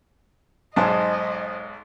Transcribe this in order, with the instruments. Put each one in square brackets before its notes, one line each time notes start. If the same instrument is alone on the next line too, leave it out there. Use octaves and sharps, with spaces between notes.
[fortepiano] B1 G#2 [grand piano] C5 G#5 A5 [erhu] D#5